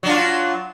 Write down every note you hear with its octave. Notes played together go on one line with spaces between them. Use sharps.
F#3 D4 F4